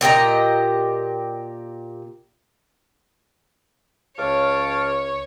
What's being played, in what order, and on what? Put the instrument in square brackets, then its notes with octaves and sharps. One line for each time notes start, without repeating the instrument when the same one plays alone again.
[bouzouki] A#2 G4 D#5 A#5
[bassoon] C#2 [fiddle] C#5 [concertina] F5 A5 D6